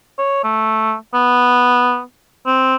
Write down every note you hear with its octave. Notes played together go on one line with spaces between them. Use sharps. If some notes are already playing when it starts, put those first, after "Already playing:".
C#5
A3
B3
C4